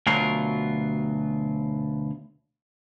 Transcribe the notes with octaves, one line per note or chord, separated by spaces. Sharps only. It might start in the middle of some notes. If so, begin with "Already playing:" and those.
D2 B2 F#3 F4 A#4